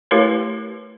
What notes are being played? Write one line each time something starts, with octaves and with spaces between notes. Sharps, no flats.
A3 E4 G4 A#4 B4 C#5